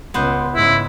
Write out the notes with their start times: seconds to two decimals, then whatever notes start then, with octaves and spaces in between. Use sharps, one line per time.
0.14 C#2 B3 C5
0.55 G#2 C#3 E4